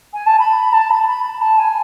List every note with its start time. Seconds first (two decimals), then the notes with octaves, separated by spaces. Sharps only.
0.13 G#5
0.26 A5
0.39 B5
0.56 B5
0.73 A5
0.90 B5
1.07 B5
1.24 B5
1.41 A5
1.58 G#5